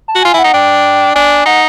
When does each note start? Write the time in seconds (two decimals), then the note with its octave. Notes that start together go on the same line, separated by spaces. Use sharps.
0.08 A5
0.15 F#4
0.23 F4 G#5
0.34 E4
0.39 F#5
0.44 D#4
0.54 D4 G5
1.15 D4 G#5
1.46 D#4 F#5